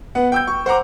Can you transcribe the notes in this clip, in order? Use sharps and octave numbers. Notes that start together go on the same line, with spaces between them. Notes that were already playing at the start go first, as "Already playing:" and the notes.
B3 F#5
G5 E6 G6
C#6
C5 F#5 A#5 D6